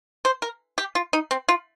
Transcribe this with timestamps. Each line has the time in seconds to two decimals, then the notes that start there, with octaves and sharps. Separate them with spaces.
0.25 C5
0.42 A#4
0.78 G4
0.95 F4
1.13 D#4
1.31 C4
1.48 F4